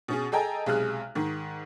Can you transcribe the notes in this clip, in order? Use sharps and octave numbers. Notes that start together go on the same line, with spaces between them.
B2 C#4 G#4
G#4 A4 D#5 G5 G#5 A#5
B1 C3 G#3 G#4 F6 F#6
G#2 D#3